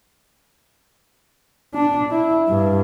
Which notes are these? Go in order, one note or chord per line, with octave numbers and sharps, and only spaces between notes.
D4
E4
G2